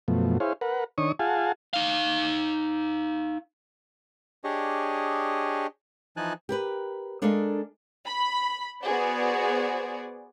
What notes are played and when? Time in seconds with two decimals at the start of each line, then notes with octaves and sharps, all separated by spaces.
0.08 F#2 B2 F3 A3
0.40 E4 G#4 C5 C#5 F5
0.61 A#4 B4 F#5
0.98 D#3 D4 C#5 C#6 D#6
1.19 F4 G#4 F5 F#5 G#5 A5
1.73 D#4 F5
4.44 D4 G4 G#4 C#5 D#5
6.17 E3 F3 D#4 G#5 A5 F#6
6.49 G4 A#4 B4
7.22 G#3 D4 A4 A#4 D#5 F5
8.06 B5
8.83 B3 F#4 G#4 C5 D5